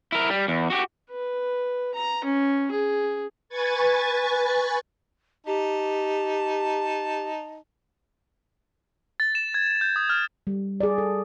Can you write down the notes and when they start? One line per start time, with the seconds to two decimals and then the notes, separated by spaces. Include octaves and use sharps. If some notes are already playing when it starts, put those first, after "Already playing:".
0.12 E4 A#4
0.30 G3
0.48 E2
0.70 F#4 G4
1.10 B4
1.95 A#5
2.25 C#4
2.71 G#4
3.49 B4 G#5 C#6 G#6 A6
5.47 D#4 G4 A5
9.20 A6
9.35 E7
9.54 G#6
9.81 G6
9.96 D#6
10.10 F6
10.47 G3
10.80 G#4 D5
10.98 A4